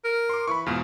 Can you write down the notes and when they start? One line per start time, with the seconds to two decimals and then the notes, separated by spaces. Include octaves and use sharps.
0.04 A#4
0.29 C6 D6
0.48 E3 B5 C#6
0.66 E2 G#2 B2 F4